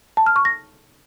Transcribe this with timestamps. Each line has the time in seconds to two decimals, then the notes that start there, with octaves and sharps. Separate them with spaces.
0.17 A5
0.26 F6
0.36 C#6
0.45 A#6